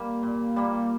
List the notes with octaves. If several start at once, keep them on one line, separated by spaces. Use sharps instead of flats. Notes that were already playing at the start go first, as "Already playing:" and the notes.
Already playing: G3 A#3
A#2
G3 A#3